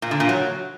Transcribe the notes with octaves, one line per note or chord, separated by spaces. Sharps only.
A#2
D3
A#2
F#3